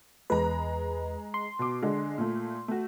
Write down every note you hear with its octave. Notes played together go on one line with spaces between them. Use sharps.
E2 G#3 B4 A#5
C6
B2 D6
D3 G#3
A#2 A3
A3 F#4